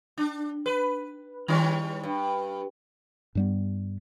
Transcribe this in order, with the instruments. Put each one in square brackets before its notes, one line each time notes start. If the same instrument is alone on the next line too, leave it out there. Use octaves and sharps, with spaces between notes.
[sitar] D4
B4
D#3 G3 C#4
G2
[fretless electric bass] G2 G3 B3